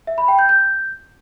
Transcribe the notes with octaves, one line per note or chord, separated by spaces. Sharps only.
E5
B5
G5
G6
G6